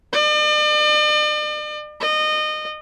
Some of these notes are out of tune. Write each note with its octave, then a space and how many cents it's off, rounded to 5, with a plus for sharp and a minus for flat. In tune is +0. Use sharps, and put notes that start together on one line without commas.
D5 +45
D#5 -25